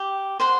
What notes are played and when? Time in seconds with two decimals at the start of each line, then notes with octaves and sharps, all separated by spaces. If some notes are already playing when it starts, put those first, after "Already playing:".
Already playing: G4
0.40 C5 F#5 C6